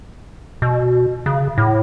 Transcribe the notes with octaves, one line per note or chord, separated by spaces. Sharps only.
B2
C#3
A2